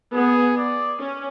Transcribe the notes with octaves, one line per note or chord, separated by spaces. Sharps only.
B3 G#4
D5
C#4